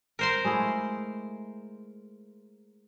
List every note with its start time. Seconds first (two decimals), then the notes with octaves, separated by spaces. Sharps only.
0.19 A#4 C5 C6
0.44 G#3 A3 E4